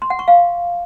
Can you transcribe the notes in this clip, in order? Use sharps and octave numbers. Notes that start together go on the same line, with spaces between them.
C6
F#5
C#6
F5